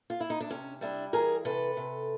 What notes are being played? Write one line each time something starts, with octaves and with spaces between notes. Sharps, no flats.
F4
E4
D#4
D4
C3 C#4
G3 D4 E4
E3 G#4 A#4
C3 A4 B4
C3